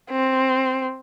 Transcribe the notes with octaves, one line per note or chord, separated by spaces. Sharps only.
C4